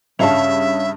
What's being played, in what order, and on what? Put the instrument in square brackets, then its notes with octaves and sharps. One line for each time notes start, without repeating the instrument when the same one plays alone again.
[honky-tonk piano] G2 C#3 F7 [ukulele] C#4 F5 A5 [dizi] E5